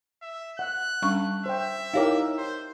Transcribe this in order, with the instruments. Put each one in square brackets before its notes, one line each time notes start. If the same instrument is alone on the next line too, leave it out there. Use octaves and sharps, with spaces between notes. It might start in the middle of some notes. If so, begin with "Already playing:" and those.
[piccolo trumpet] E5
[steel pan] F#5 [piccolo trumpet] F#6
[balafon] G3 C#4 C#6 [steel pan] D4
[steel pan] C5 G5 [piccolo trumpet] E5
[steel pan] D#4 G4 A#4 [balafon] E4 C#5 F5
[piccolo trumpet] C5